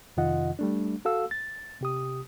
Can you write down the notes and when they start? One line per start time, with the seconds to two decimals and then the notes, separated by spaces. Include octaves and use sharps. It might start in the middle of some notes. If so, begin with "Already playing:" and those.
0.17 F2 C3 D#3 F4 D#5 F#5
0.59 G3 A3 D4
1.05 F#4 A4 F5 E6
1.31 A6
1.81 C3 G4 D#6